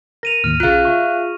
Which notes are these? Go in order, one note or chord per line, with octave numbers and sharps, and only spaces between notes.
A#4 A#6 D#7 F7
D#2 A2 D#3 F6 D#7
B1 C#3 F4 G#4 F5 F#6
E5 C#6